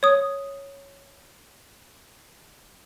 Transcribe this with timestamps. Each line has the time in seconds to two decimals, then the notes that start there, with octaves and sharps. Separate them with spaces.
0.03 C#5 D#6